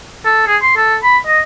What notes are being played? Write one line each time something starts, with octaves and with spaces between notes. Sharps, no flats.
A4
G#4
C6
A4
B5
D#5